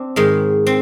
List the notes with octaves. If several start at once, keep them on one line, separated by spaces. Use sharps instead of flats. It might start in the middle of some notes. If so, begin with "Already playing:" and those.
Already playing: C4 D4
G#2 D#3 G#3
C4